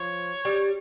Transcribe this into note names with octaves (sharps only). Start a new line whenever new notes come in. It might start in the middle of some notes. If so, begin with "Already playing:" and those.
Already playing: F3 C#5
G3